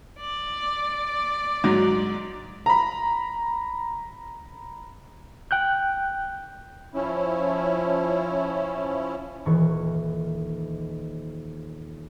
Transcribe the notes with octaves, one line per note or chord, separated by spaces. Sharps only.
D5
G#2 F#3
A#5 B5
G5 F#6 G6
F3 C#4 E4
D#1 D#3 E3 C#6 C#7